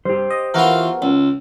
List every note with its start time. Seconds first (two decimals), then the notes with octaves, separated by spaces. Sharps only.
0.05 G2 G4 C5
0.30 D#5
0.54 E3 B3 F4 F#4 A#4
1.02 C#2